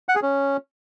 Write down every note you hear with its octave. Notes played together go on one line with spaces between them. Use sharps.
F#5
G#4
C#4